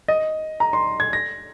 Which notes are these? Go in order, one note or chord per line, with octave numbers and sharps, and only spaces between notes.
D#5
A#5
C6
G#6
A#6